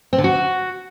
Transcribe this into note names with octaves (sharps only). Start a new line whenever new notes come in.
C4
D3
F#4